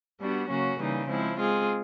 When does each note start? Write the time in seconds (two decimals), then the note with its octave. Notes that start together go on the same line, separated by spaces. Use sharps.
0.21 G3 B3 D4 F#4
0.49 C#3 F#3 A#3 C#4 F#4
0.79 C#3 E3 G3 A#3 D#4
1.08 F3 G#3 C4 E4
1.37 G#3 C4 F4 G#4